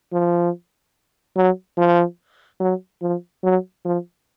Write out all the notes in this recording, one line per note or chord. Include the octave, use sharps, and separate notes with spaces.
F3
F#3
F3
F#3
F3
F#3
F3